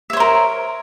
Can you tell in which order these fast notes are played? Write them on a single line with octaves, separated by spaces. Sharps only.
E5 C#5 C5 A#4